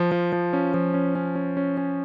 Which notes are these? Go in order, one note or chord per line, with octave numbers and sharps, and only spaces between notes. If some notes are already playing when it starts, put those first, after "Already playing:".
Already playing: F3
F3
F3
C#4
F3
C#4
C#4
C#4
C#4
C#4